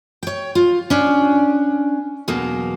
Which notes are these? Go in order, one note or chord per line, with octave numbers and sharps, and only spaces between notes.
C#5 G5
F4
C#4 D4
E2 B2 F#3 A#3